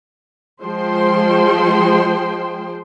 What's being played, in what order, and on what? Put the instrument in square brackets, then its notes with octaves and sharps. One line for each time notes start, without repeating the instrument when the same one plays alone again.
[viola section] F3 G#3 G#4 C5 G5 C6